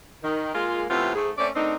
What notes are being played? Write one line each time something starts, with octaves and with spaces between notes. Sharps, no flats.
D#3
G#3 A#3 F4
A2 C3 E3 B3 C4 F4
G#2 A3 G#4
A3 C4 C#4 D5
D#3 A3 C4 D4 D#4